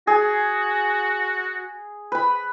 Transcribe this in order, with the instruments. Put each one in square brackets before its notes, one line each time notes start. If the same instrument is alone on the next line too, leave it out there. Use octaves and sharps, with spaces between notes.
[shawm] F#4 [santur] G#4
[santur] B4 B5